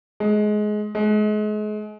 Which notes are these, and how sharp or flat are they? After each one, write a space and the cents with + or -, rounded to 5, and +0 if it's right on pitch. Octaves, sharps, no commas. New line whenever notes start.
G#3 +20
G#3 +35